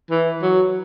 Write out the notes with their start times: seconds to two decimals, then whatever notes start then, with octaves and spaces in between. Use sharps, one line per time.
0.11 E3
0.42 F#3